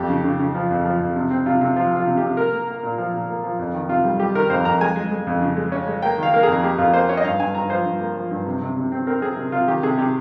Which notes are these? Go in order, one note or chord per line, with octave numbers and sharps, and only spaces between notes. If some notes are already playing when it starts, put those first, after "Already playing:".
Already playing: F2 G4
C#3
C#3
C#3
F3
F2
F3
F2
C3
C4
C3 F4
C3
F3 F4
F3 F4
C3
G4
C3
A#3 A#4
A#3
A#3
A#2
F3
A#2
A#3
F3
F2
D#3
C3 F4
G3
G3 G4
D#3 A#4
F2 C5
F2 A#5
G#3 G#5
G#3
G#3
F2
C#3
G#3
C#4
G#3
A#3 G5
D#3 F5
A#3 A#4
F2 G#4
A#3 G4
F2 F4
A#3 C5
C#4 C#5
D#5
G2 F5
G2 G#5
G2 A#5
F3 C5
G2
A#3
F3
G2
C3
C3
C3
C4
C4 A#4
C4 G#4
C3
C3 F4
D#3 G4
C3 G#4
C3 G4